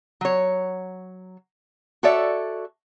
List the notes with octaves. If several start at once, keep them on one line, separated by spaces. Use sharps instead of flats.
F#3 C#5
F#4 A4 C#5 D5 E5